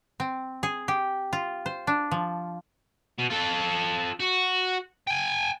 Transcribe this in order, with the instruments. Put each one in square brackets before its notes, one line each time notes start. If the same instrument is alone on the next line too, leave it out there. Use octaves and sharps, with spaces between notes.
[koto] C4
G#4
G4
F4
C5
D4
F3
[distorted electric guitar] B2
F4 A4
F#4
G5 G#5